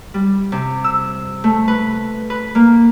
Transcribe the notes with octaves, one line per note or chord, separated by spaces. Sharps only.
G3
C3
E6
A3
B4
B4
A#3